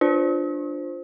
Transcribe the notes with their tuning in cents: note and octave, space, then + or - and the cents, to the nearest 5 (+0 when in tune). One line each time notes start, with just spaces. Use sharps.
D4 +5 F4 +0 C5 +0